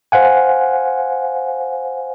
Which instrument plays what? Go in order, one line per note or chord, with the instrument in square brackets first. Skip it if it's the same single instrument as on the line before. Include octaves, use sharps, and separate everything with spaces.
[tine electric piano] C5 F5 F#5 G#5